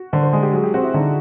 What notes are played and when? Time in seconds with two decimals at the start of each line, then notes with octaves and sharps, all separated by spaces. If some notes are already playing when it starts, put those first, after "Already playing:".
Already playing: F#4
0.13 D3 C5
0.23 C5
0.33 G#3 G#4
0.43 G4
0.53 F#3 G#4
0.64 G4
0.74 C4 F#4
0.84 E4
0.94 D3 D#4